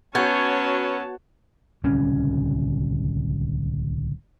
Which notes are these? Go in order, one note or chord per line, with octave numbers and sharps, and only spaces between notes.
F#3 B3 C#4 F#4 C#5 A5 G6 G#6
D1 C2 C#3 C#4